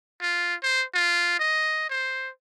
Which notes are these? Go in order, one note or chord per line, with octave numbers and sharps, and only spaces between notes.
F4
C5
F4
D#5
C5